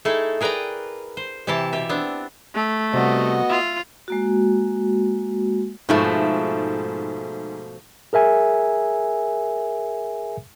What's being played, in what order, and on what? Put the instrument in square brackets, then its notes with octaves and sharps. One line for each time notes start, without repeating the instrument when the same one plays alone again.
[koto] A3 D#4 E4 G#4 A4
G#4 A#4 B4 D5 G5 A#5
C5
C3 E3 E4 G4 A5
B2 G4 E5
B3 C4 D4
[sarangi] A3
[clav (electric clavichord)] C3 G3 [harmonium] B3 F#4 D#5
[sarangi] F4 [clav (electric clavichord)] E5
[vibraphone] G#3 A#3 F#4
[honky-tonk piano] G#2 [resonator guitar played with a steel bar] B2 F3 A3
[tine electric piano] G#4 A#4 E5 G#5